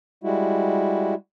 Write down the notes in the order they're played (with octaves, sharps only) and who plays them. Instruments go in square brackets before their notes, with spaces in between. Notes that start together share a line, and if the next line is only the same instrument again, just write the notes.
[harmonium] G3 G#3 E4 F#4